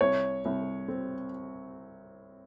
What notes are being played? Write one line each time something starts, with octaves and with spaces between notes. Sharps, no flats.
C2 C#5
C2
C4